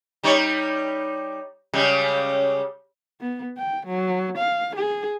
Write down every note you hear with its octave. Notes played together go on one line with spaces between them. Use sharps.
G3 D#4 C#5
C#3 G3 G#3
B3
G5
F#3
F5
G#4